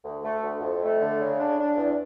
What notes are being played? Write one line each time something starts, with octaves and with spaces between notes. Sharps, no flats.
D2
A3
D2
F2
A3
D3
C#3
D4
D4
E2